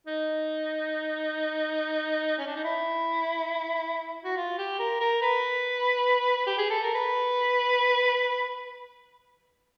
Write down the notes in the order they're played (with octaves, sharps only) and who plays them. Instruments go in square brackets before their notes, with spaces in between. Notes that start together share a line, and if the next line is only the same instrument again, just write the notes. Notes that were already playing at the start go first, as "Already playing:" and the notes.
[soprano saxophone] D#4
C#4
D4
D#4
E4
F#4
F4
G4
A#4
A#4
B4
G4
G#4
A4
A#4
B4